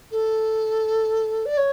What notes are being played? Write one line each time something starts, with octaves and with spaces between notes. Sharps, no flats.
A4
D5
C#5